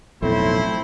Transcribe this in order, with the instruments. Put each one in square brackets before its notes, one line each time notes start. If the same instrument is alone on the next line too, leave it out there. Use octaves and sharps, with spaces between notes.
[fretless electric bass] B1 F2 [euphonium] A2 [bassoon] A3 [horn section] C4 E4 C5